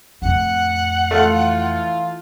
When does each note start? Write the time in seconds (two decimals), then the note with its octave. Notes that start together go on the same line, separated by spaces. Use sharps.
0.22 F2 A2 F#5
1.11 E3 A3 E4 F4 F5